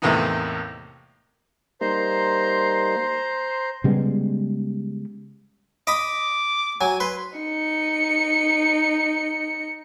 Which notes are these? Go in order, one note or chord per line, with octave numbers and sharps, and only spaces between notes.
E2 A2 C3 A#3 B3 D#4
G3 A#3 D#4 C5 A#5 C6
C#3 G3 G#3 B3
D#5 B5 D6 D#6
F#3 G#5
B4 C6
D#4 C#7